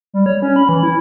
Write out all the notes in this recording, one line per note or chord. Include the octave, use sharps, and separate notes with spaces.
G3
C#5
C#4
B5
E3
E4